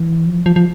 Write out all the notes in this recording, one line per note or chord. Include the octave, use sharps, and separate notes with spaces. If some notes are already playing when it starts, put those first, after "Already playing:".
Already playing: E3
F3
F3
F3